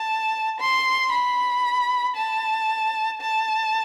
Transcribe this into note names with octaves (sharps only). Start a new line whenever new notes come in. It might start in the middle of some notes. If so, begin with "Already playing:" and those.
Already playing: A5
C6
B5
A5
A5